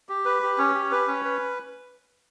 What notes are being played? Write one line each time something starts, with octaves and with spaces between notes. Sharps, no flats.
G4
B4
G4
C#4
G4
B4
C#4
B4